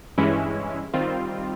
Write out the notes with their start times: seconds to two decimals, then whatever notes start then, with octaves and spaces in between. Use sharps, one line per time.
0.18 G2 E3 G#3 C#4 E4
0.94 D#3 G3 C4 F4